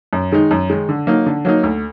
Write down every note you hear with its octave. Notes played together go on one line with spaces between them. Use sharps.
F#2
D#3 G#3 D#4
F#2
D#3 G#3 D#4
D3
F#3 A#3 D#4
D3
F#3 A#3 D#4
D2